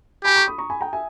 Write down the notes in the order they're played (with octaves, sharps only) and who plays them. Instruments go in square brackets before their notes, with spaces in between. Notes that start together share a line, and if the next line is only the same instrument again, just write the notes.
[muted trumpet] G4 [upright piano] G#5 B5
[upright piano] A#5 C#6
B5 D#6
A#5 C#6
G#5 B5
G5 A#5
E5 G#5